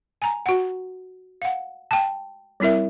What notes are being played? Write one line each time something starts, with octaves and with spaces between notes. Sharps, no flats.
G#5 A#5
F#4 F#5
F5 F#5
G5 A5
G3 C4 E4 A#4 E5